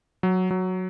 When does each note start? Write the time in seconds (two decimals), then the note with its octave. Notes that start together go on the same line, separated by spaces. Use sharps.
0.23 F#3
0.51 F#3